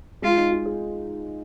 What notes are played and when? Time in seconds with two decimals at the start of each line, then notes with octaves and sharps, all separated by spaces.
0.22 G#3 F4
0.37 D#4
0.52 F4
0.66 G#4